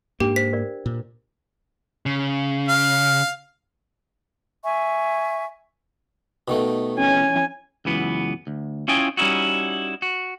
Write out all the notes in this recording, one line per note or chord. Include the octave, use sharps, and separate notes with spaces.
G#2 A#3 D4 G4 G5
C5 B6
A#4 D5
A#2
C#3
F5
E5 G#5 C#6
B2 D#3 A3
C#4 G#5
C#2 F#2 E3 B3
D2
C#4 E4 F4 D#5 G5 G#5
G3 C#4 D#4 E4 F#4
F#4